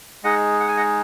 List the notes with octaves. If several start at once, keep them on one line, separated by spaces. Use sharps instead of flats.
G#3 D#4 G#4 D#5 F#5
F#5
G#5
D#5 F#5